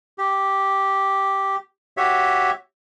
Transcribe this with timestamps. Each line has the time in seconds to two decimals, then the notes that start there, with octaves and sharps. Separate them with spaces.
0.18 G4
1.97 F#4 G4 C#5 E5